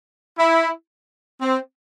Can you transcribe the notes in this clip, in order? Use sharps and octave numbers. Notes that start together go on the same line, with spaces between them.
E4
C4